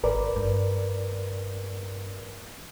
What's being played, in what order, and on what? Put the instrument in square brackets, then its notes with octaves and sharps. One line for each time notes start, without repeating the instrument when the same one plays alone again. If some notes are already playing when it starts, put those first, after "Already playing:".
[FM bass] G#1 [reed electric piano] A#4 B4 D5
[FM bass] G2